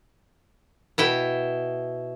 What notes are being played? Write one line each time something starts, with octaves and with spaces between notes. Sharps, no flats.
B2 E4 G5